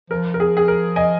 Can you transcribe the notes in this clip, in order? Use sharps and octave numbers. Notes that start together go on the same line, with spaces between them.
F3 A#4
A#4
G#4
G#4
A#4
D#5 G#5